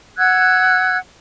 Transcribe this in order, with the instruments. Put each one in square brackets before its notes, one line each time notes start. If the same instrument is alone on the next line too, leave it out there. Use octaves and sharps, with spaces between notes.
[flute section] F#5 E6 F#6 G#6